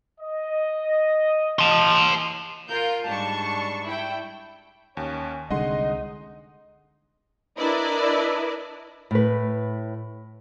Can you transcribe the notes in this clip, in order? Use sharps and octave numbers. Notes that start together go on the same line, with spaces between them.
D#5
A5 C6
F4 A#4 G6
G#2 G3 D4 A5 C#6
E4 G5
D#2 C#4
C2 D3 G#3 D#4 D#5 F#5 C6
D4 E4 A#4 B4 D5 D#5
A2 B4